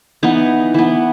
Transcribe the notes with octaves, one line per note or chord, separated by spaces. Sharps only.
E3 B3 D#4
E3 B3